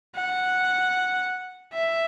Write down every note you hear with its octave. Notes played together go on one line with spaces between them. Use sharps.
F#5
E5